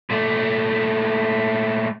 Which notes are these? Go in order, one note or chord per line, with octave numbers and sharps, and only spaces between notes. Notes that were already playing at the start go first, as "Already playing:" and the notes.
A#2 A3